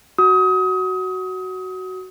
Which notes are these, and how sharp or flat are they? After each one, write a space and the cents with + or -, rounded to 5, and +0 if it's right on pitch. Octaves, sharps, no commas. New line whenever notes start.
F#4 +10 D#6 +30